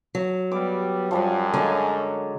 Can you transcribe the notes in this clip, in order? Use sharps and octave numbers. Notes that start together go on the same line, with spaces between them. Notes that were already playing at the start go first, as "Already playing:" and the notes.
F#3
G3 B3 D6
F#2 F3 G3 A5
D3 F#3 G#3